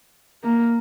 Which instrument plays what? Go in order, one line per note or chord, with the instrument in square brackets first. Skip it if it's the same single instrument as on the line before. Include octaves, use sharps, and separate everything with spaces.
[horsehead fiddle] A#3